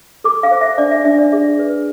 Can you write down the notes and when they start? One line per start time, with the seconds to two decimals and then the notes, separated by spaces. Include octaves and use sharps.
0.24 A4 D6
0.43 F5
0.51 C5
0.61 E5
0.78 D4 D5
0.91 E5
1.05 D4 E5
1.19 D5
1.32 G#4 E5
1.59 B4